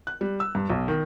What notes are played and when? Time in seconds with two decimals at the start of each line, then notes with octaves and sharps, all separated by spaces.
0.07 F#6
0.21 G3
0.40 E6
0.55 G2
0.70 B1
0.88 D#3